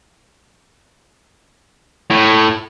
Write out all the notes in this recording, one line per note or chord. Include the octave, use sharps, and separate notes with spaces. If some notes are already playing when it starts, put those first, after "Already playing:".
A2